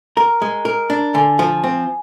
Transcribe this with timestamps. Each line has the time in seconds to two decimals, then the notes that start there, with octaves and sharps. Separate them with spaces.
0.17 A#4 A#5
0.42 G#3
0.65 A#4
0.90 D4
1.14 D3 G#5
1.39 F3
1.64 C4